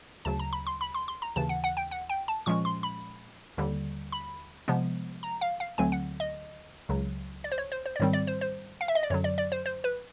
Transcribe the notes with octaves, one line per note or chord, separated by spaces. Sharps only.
D2 C#3 F#3 A5
A#5
B5
C6
B5
C6
C6
A#5
D#2 C#3 E3 A5
F#5
F#5
G5
F#5
G5
A5
A#2 F3 G#3 C#4 C#6
C6
B5
D#2 D3 G3
B5
C3 F3 G#3 B3
A#5
F5
F5
D2 D3 F#3 A3 C4 G#5
F#5
D#5
C#2 C#3 F#3
D5
C5
C#5
C5
C5
D5
G#2 D#3 G3 C4 C#5
D5
C5
C5
F5
E5
D#5
D5
F#2 D3 F#3 C#5
D5
D5
C5
C5
B4